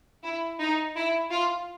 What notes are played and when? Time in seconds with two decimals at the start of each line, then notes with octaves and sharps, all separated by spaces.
0.24 E4
0.60 D#4
0.96 E4
1.31 F4